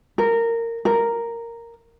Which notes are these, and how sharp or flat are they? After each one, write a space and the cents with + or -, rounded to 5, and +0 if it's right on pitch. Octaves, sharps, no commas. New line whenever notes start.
A#4 -15
A#4 -5